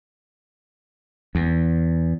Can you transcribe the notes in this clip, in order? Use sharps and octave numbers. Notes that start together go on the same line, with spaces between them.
E2